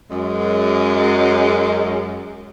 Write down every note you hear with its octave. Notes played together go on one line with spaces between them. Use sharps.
F#2 G#3